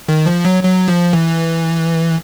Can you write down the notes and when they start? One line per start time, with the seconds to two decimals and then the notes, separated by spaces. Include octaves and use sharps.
0.09 D#3
0.26 F3
0.45 F#3
0.63 F#3
0.88 F3
1.13 E3